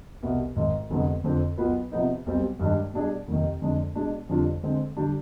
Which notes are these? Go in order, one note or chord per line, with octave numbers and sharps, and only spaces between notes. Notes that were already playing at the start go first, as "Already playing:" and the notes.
C2 B2 B3
G#1 G#2 D#3
F1 F2 D3 G#3 B3
F2 D3 F3 C4
B1 B2 B3 F4 B4
C3 F3 B3 D#4
B1 B2 G3 C4
G2 D#3 G#3 D4
B2 G3 D4 G#4 D5
F1 D#2 D#3
F2 D3 G#3 D4
B2 G#3 D4 G#4
F2 D3 G3 D4 F4
D3 G#3 C4
D3 G3 D4 G4